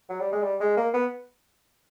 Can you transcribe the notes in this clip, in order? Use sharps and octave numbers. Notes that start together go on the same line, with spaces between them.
F#3
G3
G#3
G3
G#3
A#3
B3